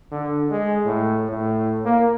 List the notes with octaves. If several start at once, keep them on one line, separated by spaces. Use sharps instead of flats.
D3
G#3
A2
A2
A#3